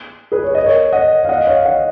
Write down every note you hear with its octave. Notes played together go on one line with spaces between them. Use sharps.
G#4 B4
C#5
D#5
A#4 C#5
D#5 F#5
F5
D#5 F#5
C#5 F5
D#5 F#5